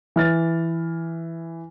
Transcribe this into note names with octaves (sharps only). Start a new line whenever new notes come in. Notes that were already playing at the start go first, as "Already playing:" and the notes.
E3 F6 A6